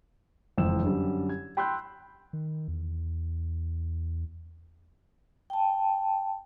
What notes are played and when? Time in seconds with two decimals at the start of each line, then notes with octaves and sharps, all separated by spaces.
0.57 F#1 F2 G#2 E3 E6 E7
0.83 F#2 D3 G3
1.29 G#6
1.57 G5 B5 C6 E6 F#6 G6
2.33 D#3
2.68 E2
5.50 G5 A5